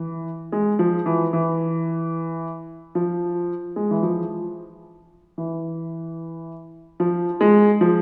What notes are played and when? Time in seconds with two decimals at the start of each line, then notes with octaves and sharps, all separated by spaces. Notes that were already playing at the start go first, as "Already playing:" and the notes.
Already playing: E3
0.52 G#3
0.79 F3
1.06 E3
1.33 E3
2.95 F3
3.76 G#3
3.91 E3
4.03 F3
5.38 E3
7.00 F3
7.41 G#3
7.81 F3